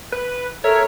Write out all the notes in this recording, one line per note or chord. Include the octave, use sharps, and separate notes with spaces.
B4
A4 A#4 C#5 E5